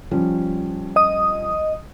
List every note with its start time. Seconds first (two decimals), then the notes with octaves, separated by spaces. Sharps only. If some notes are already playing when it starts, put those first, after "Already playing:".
0.11 F3 G3 C#4
0.96 D#5 D#6